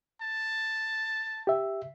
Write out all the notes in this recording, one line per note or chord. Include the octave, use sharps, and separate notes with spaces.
A5
G4 E5